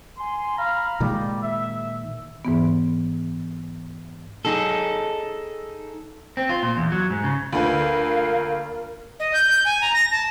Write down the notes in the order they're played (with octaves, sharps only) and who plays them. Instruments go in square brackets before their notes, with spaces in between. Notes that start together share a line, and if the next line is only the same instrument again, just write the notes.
[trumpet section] G#5 C6
F5 A#5 B5
[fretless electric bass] A#2 D#3 G#3 [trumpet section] G3
[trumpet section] E5
[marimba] G#2 E3 B3
[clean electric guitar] D#4 G#4 A4
C4
F4
A#2
E2
F#3
G#2
C#3
[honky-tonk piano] D2 [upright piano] A#2 D4 B4 [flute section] A#4 [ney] F5
[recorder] D#5
G6
G6
G#5
A#5
A#6
A5